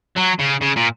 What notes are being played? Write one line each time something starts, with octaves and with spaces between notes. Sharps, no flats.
F#3
C#3
C#3
A#2